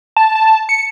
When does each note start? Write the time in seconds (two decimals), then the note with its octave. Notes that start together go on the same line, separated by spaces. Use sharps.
0.17 A5
0.35 A5
0.69 C#7